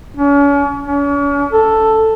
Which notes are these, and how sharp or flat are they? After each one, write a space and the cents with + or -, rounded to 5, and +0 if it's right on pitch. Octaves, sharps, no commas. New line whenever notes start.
C#4 +40
C#4 +40
A4 +5